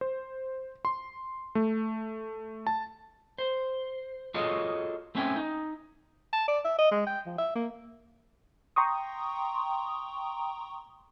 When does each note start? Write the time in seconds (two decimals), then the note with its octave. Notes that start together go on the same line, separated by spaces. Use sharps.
0.01 C5
0.85 C6
1.55 A3
2.67 A5
3.38 C5
4.34 F4 F#4 G#4 A4 C#5 D#5
5.15 A3 C4 C#4 E5 G5 G#5
5.36 D#4
6.33 A5
6.48 D5
6.65 E5
6.78 D#5
6.92 G#3
7.07 G5
7.26 F3
7.38 E5
7.55 A#3
8.76 G5 A#5 C6 C#6 D#6